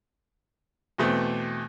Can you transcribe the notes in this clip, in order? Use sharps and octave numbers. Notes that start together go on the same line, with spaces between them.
E2 B2 A3 C4